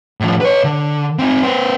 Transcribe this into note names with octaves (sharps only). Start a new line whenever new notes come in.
A2 F3
B4 C#5
D3
C4 D#4
B3 C5